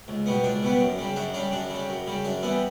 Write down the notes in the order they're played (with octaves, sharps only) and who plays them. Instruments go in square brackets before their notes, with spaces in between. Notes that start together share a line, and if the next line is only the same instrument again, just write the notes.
[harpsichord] C#2
B2 G3 B3
C#2 D4
B2 G3 B3
F#2
C#3 G3
F#2 D4
C#3 G3 D4
F#2 D4
C#3 G3
F#2
C#3 G3
F#2 D4
E3 G3 B3